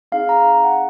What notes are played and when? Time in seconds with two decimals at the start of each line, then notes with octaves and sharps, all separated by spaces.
0.12 C4 D#4 G#4 F5
0.29 A#5
0.64 F#5